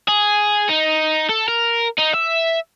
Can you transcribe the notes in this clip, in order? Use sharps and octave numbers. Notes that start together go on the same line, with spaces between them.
G#4
D#4
A4
A#4
D#4
E5